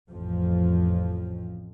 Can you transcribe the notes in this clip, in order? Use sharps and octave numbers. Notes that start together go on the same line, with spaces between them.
A1 F2 F3